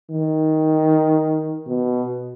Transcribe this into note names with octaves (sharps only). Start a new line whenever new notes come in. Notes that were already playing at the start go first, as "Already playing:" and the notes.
D#3
B2